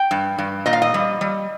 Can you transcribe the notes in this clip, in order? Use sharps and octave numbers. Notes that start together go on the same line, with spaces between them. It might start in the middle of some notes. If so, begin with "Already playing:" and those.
Already playing: G5
G2
G2
A#2 D#5
F5
D#5
G3
G3